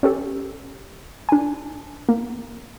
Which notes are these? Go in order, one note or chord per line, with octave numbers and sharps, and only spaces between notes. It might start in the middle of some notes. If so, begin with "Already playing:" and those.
C#4 G4 A4
D4 G#5
A#3